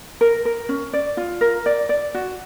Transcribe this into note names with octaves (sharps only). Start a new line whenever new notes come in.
A#4
A#4
C#4
D5
F4
A#4
D5
D5
F#4